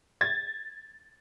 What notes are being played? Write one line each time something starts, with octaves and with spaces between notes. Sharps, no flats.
G#6 A6